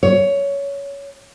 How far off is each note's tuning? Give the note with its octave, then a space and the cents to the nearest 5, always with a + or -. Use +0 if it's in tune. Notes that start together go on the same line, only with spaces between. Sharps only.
C#5 +15